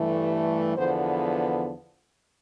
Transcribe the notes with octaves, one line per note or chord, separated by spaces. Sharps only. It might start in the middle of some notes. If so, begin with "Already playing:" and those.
Already playing: G2 E3 A3
E2 D3 F3 B3 C5